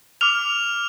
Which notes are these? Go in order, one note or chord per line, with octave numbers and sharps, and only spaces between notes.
D6 F6 F7